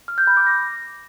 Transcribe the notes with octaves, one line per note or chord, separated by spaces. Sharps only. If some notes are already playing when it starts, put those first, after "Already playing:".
F6
G6
B5
D6
A#6